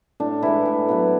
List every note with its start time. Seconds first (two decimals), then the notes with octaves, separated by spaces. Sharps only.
0.20 A2 D4
0.42 E3 G#3 E4
0.66 A2
0.89 F#3 B3